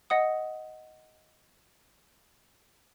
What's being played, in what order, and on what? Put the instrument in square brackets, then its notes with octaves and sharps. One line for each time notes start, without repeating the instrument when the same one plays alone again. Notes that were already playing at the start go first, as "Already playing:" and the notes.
[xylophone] D#5 F#5 D#6